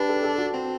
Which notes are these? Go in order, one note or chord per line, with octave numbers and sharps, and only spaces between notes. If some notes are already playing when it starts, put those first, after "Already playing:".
Already playing: D4 G4 B4
A4
A4
F#4
C4